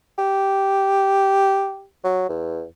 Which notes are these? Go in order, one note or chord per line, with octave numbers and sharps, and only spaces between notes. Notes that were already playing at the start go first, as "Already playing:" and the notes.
G4
F#3
E2